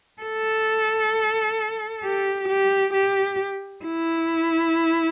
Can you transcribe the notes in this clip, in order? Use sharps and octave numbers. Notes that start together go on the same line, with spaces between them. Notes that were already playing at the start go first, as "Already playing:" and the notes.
A4
G4
G4
G4
E4